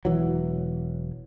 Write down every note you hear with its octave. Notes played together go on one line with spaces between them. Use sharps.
E1 E3 F#3